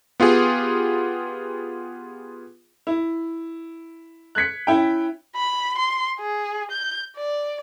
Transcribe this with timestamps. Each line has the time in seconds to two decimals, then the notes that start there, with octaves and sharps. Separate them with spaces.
0.20 B3 F4 G4 G#4
2.87 E4
4.35 F#6 G#6 B6 C#7
4.67 C#4 E4 G5
5.35 B5
5.77 C6
6.19 G#4
6.71 G6
7.17 D5